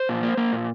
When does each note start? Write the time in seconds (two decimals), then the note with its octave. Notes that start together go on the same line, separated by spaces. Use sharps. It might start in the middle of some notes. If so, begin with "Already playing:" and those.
Already playing: C5
0.09 A#2
0.23 A#3
0.37 A#3
0.53 A#2